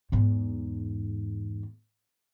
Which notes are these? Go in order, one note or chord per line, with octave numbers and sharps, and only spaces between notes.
E2 G#2